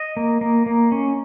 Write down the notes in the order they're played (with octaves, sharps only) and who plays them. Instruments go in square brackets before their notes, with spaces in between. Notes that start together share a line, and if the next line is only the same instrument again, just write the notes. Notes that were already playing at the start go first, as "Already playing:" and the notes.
Already playing: [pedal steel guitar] D#5
A#3
A#3
A#3
C#4